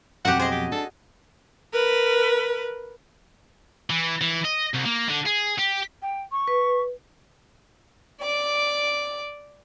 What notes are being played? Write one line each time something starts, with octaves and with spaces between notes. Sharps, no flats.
F2 B2 F#3 F#4 G4 F#5
G#4 C5 D#5
G4
D4 A4
A#4 B4
E3
E3
D#5
C2
A#3
D3
G#4
G4
G5
C#6
B4
D5 D6